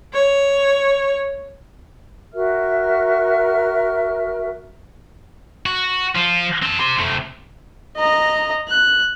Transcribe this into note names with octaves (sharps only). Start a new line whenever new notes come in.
C#5
F#4 A#4 E5 F6
F#4
F3 F4
C4 A5
G4 C6
C3 A3
D#5 A#5
F#6